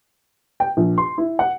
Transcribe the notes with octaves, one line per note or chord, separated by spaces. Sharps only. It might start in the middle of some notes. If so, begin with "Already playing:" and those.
G5
A#1
C6
E4
F#5